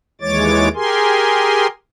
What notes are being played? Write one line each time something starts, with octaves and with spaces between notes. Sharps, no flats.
D#2 E3 G#3 C#5 D6 A6
G4 G#4 A#4 G#5 C6